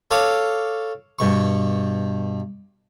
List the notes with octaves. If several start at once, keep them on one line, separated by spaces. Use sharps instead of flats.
A4 C#5 F5 D6
G2 B2 C#6